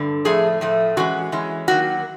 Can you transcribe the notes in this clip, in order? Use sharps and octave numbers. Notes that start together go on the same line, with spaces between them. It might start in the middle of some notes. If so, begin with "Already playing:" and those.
Already playing: G2 D3
A2 F3 A3 G#4
A2 F3 A3
E3 G#3 C#4 F#4
E3 G#3 C#4
D#3 F#3 A#3 F#4